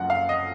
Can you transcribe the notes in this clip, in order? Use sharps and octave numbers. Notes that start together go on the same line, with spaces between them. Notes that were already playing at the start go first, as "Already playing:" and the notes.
Already playing: F#1 F#2 F3 F#5
F5
D#5